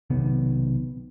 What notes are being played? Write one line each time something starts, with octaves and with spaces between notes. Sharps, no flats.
B1 C3 D#3 B3